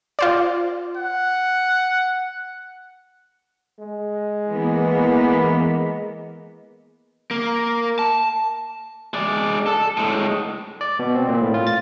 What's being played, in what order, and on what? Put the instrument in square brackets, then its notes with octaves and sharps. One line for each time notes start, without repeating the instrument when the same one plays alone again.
[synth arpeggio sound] F4 C5 D5
[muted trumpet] F#5
[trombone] G#3
[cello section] E3 A#3 B3
[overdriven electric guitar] A#3
A5
[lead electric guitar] G#3 D5
A4
A2 G#3
[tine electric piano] D5
B2
C4
A#2
A2
F4
A6